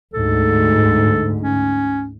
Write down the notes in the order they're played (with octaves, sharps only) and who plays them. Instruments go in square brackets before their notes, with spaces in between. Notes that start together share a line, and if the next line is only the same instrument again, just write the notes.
[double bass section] D2 G#2 [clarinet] A4
[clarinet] C#4